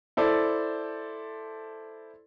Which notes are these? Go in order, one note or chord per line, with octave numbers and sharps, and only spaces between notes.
E4 A4 C5 D5